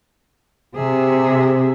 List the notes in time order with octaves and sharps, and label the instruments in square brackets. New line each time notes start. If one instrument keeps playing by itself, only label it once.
[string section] C3 [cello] G#4 E5